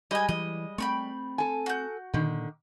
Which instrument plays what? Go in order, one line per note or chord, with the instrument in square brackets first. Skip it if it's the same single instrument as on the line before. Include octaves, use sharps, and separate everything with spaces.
[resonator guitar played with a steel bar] G3 G#3 G4 [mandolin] D#5 G#5
[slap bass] E3 [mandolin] D#5
[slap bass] A3 C4 [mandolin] G5 B5 C#6
[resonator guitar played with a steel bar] A4 G#5
[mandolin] F#4 G6
[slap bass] A#2 [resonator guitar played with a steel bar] D3 D#3